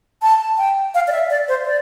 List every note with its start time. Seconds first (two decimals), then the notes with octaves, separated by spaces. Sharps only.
0.22 A5
0.57 G5
0.94 F5
1.07 D5
1.12 E5
1.30 D5
1.48 C5
1.65 D5